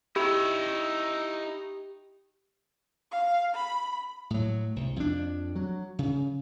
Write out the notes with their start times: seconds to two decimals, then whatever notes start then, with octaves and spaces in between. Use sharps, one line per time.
0.16 D#4 E4 G4 E5
3.11 F5
3.55 B5
4.30 A2 F#3
4.76 C2
4.96 F2 D4
5.55 F#3
5.99 C#3